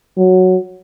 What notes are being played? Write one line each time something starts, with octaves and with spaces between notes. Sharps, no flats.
F#3